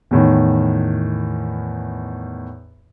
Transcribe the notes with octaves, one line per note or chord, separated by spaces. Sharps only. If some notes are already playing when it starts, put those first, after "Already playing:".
E2 A2 D#3